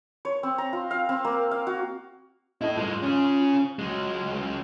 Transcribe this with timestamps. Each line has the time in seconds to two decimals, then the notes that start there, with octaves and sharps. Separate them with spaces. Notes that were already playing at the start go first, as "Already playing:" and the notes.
0.25 C#5
0.43 C4
0.58 A#5
0.73 F4
0.91 F5
1.09 C4
1.25 A#3
1.51 F5
1.67 F#4
2.61 E4 A4 D#5
2.75 G2 G#3 F4
3.03 C#4 G#4
3.79 C#2 F#3 G#3